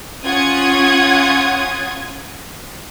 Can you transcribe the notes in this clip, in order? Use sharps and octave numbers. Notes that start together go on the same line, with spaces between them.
C#4 F4 F#5 D#6 G#6